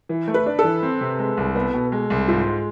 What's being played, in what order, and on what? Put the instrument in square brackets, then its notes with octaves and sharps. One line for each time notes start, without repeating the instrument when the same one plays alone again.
[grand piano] E3
A3
[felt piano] B4
[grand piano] D4
[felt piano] A4
[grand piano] E3
C4
C3
G#3
C2
B3
B2
G#3
C2
[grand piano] G#2 [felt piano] F4
[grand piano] G#3